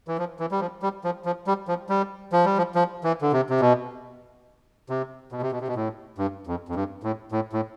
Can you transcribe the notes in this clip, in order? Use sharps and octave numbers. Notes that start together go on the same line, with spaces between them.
E3
F3
E3
G3
F3
G3
F3
F3
G3
F3
G3
F3
G3
F3
F3
E3
D3
C3
C3
B2
C3
B2
C3
B2
C3
B2
A2
G2
F2
F2
G2
A2
A2
A2